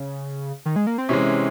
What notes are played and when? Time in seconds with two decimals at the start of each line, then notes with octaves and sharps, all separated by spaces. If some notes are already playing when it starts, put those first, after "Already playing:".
Already playing: C#3
0.66 D#3
0.76 G#3
0.87 A#3
0.98 C4
1.09 C3 E3 G#3 C#4